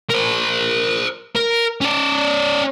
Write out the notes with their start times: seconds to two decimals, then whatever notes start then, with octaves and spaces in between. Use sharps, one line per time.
0.10 A#4 C5
1.36 A#4
1.81 C#4 D5